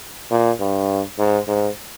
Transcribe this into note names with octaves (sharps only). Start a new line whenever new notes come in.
A#2
G2
G#2
G#2